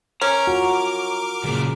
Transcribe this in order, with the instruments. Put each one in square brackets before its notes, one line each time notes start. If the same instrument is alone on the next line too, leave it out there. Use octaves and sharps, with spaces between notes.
[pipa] C#4 [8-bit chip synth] A#4 D6 [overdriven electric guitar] A#5
[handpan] F4 F#4
[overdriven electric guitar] F#2 A#2 [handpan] C#3